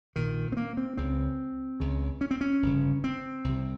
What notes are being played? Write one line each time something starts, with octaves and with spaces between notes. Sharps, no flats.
A#1 A#2 D#3
C4
A#3
C4
C#2 C#3 C4
C#2 C#3
C#4
C4
C#4
G1 F2 C#3
C4
C2 C3